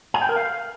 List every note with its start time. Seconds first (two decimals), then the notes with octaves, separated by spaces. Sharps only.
0.14 G#5
0.22 G5
0.29 A#4
0.36 F5